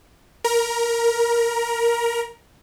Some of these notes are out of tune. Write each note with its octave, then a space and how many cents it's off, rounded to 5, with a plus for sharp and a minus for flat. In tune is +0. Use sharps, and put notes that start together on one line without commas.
A#4 +0 A#5 +35